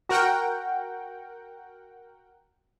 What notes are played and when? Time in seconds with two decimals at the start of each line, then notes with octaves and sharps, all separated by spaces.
0.09 F#4 A#4 F#5 G5